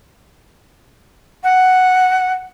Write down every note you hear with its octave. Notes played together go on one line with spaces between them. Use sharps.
F#5